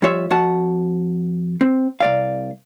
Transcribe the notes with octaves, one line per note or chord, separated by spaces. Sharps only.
F2 G3 F4 C#5 E5
F2 F#4 F#5 A5
C4
C2 D5 F5